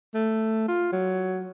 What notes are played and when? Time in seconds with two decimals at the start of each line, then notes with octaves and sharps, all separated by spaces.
0.14 A3
0.68 F4
0.92 F#3